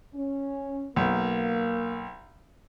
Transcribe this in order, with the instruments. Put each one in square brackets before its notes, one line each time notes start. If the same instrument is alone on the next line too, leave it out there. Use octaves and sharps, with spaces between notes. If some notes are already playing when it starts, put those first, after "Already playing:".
[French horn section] C#4
[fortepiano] B1 [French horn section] A#3